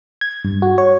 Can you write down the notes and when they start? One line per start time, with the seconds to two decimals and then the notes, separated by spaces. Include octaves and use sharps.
0.21 G#6
0.45 G2
0.62 F#4
0.78 C#5